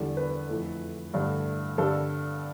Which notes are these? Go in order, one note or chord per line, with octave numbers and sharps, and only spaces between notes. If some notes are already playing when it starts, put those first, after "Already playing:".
Already playing: E2 D3 G3
B4
F2 E3 A3
G2 D3 A3
G2 D3 G3 A4